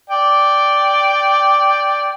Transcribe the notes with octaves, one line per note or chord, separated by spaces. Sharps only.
D5 G5